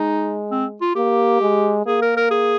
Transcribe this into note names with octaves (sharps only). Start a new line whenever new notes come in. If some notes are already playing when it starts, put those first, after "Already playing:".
Already playing: G#3 D#4
C4
F4
A#3 G4
G#3
A#3 G#4
A#4
A#4
G#4